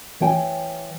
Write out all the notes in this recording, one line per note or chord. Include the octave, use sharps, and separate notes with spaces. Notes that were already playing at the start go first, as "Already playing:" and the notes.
E3 C#5 G5 G#5